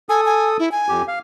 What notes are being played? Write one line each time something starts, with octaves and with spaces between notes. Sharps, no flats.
A4 G#5 D#6
G#5
E4
G#5
F2 G4
F5